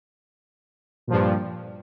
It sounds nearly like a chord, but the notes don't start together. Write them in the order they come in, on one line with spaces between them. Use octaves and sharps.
A#2 F3 G2